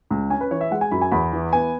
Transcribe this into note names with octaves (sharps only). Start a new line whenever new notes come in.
C#2
C#4 G#5
B4
E3 C#5
E5
G#3 F#5
G#5
F#2 B5
G#5
E2 B5
E3
B3 G#5